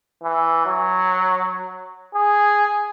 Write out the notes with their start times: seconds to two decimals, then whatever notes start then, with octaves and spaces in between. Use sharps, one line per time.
0.23 E3
0.66 F#3
2.15 G#4